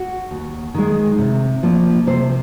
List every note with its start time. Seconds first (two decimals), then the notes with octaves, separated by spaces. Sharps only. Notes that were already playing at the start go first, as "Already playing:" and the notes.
Already playing: F#4
0.31 D#2
0.74 D#3 G#3
1.18 C3
1.63 F3 A#3
2.07 C3 C5